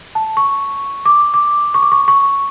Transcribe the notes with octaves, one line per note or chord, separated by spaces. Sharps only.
A5
C#6
D6
D6
C#6
D6
C#6
C#6